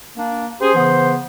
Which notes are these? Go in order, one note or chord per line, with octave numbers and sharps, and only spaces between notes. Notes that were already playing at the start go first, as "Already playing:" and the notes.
A#3 D4
C#4 G4 G#4 C5
C#3 E3 B3